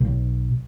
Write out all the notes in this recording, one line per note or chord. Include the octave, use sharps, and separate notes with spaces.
B1